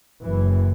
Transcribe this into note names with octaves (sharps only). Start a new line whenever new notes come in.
F#1 F#2 E3